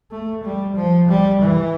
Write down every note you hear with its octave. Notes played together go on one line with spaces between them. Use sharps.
A3
G3
F3
G3
E3